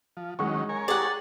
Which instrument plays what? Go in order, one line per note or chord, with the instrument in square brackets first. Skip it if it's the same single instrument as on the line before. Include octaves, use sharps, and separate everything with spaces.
[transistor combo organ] F3
[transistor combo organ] D#3 F#3 C#4 [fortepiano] G#3 F#5 C#6
[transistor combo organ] A#4 C#5 G#5
[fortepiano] G4 G#4 [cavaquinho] D5 F#5